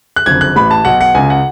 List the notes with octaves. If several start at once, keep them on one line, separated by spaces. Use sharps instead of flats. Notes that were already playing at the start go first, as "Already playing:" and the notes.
F#6
F#1 F2 D3 G#6
F#6
A1 A2 B5
A5
B1 B2 F#5
F#5
C#2 C#3 G#5
F#5